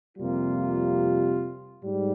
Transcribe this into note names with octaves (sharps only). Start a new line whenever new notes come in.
F2 C3 G3 A#3 F4
G#2 G3